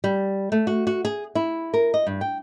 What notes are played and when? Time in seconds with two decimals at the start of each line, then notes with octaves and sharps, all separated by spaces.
0.04 G3
0.52 A3
0.67 F#4
0.87 F#4
1.05 G#4
1.35 E4
1.74 A#4
1.94 D#5
2.07 G2
2.21 G5